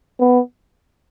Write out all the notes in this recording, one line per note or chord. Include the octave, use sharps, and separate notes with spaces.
B3